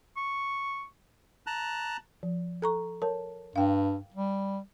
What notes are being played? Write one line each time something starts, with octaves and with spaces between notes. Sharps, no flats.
C#6
A5 A#5 F#6
F3
A4 A#5 C#6
A#4 C#5 A5
G2 F5 G5
G3